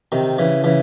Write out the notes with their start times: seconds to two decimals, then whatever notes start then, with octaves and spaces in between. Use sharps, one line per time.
0.12 C3 D#3
0.38 C#3 E3
0.64 C#3 E3